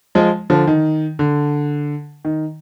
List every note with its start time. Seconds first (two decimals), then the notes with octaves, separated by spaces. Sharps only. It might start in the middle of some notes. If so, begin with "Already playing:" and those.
0.15 F3 G#3
0.50 D3 F3
0.67 D#3
1.19 D3
2.25 D#3